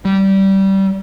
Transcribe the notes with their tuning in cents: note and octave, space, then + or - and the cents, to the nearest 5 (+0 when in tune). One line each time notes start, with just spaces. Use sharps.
G3 -20